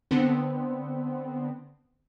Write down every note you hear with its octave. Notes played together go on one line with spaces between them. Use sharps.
D3 B3 C4